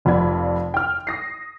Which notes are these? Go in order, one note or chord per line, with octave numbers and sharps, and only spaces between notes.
F1 F2 F4 D5 B5 G#6
G5 F6
D#6 A#6 C7